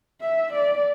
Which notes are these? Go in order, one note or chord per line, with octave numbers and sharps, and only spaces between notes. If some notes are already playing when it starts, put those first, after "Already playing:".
E5
D5